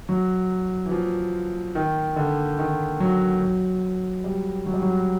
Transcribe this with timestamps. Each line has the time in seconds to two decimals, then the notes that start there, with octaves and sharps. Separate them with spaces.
0.09 F#3
0.85 E3
0.92 F3
1.75 D#3
2.16 D3
2.59 D#3
3.00 F#3
3.41 F#3
4.24 G3
4.66 F#3
4.73 G3
4.82 F#3